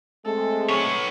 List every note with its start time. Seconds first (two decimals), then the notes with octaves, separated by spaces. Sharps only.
0.25 G#3 A3 C4 A4
0.69 B3 C#5